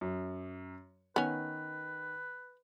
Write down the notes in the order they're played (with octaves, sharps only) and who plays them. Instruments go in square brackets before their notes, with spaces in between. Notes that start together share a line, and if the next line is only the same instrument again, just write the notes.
[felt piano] F#2
[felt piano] D#3 [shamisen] B3 C#4 [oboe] B4